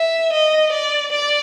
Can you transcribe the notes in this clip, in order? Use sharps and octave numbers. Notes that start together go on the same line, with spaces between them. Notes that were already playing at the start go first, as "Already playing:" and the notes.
Already playing: E5
D#5
D5
D5